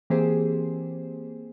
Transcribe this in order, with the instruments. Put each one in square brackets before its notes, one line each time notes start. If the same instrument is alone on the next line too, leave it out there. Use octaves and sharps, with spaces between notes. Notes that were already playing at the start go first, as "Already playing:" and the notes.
[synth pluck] E3 A#3 C4 G4 G#4 C5